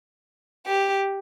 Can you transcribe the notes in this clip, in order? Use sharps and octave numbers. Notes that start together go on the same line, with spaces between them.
G4